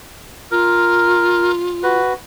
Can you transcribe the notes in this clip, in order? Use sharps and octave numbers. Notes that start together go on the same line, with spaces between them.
F4 A#4
F#4 B4